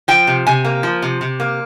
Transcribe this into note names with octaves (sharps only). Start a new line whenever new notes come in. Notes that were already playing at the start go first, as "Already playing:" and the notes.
F3 G5
C3
C3 G#5
A#3
F3
C3
C3
A#3